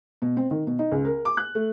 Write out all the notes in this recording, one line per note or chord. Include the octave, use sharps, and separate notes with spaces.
B2
C4
D#3
B2
D#4
C#2
A#4
D6
F#6
A3